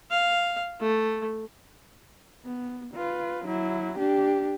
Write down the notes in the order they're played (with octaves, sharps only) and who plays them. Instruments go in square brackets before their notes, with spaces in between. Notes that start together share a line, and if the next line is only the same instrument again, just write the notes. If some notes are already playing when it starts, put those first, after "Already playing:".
[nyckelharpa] F5
A3
[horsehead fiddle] B3
F4 B4
F#3 E4
D4 G4